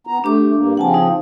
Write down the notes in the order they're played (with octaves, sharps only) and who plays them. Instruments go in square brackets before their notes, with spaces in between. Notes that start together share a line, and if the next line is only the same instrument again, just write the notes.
[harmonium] B3 A#5
[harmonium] A3 [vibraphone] D4 G4 D6
[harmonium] G2 A#3
[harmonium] C#3 F3 C4 [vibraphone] F#5 G#5 A5
[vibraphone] D#4